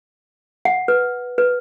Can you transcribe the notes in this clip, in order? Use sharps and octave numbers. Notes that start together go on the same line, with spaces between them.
F#5
B4
B4